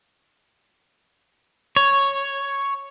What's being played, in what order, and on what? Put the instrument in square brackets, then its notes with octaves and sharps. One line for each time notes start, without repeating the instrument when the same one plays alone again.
[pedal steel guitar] C#5